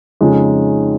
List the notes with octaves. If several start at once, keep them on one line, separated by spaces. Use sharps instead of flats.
F2 C#3 G#3 D#4